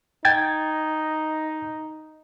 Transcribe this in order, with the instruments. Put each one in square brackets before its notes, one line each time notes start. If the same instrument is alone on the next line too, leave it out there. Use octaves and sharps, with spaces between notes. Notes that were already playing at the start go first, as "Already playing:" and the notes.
[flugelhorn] D#4 [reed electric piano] G5 G#6 A6